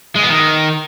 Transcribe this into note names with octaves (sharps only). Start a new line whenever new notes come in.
G#3
B3
D#3